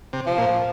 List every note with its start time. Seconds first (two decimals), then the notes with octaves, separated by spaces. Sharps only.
0.13 C3
0.27 F3
0.38 A#2